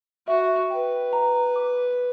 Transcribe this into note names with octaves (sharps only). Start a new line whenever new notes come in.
F#4 E5
B4 G5
A#5
D6